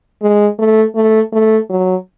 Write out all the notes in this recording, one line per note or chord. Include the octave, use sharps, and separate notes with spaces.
G#3
A3
A3
A3
F#3